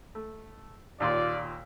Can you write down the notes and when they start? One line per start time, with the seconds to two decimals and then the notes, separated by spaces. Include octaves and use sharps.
0.15 A3
1.00 D#2 A#2 F4 D5 C6